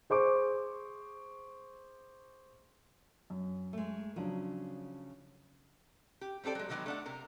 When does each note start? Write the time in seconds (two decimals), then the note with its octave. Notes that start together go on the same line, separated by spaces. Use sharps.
0.10 G#4 C5 C#6 D6
3.30 F#2
3.73 G#3 A3
4.16 C#3 F3 F#3 D4
6.21 G4
6.44 G3 C4 G4 A4 D5
6.55 F#3 G#3
6.69 B2 D3 D#3 F#3 G#3 B3
6.86 A3 D4 F#5
7.06 C3 A#4